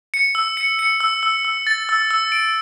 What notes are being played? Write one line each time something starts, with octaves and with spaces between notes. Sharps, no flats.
C#7
E6
C#7
C#7
E6
E6
E6
A6
E6
E6
D7